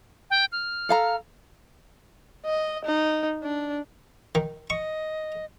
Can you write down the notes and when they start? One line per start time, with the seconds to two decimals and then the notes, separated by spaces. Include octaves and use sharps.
0.30 G5
0.52 F6
0.89 A4 F5 A#5
2.45 D#5
2.85 D#4
3.43 D4
4.35 D#3
4.70 D#5 C#6